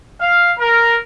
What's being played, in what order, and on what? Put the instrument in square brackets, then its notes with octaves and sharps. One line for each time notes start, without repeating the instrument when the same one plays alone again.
[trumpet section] F5
A#4